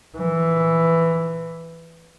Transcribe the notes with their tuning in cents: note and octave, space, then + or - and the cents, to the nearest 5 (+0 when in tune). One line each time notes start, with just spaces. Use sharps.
E3 +5